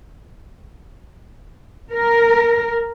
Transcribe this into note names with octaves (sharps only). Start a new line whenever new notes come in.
A#4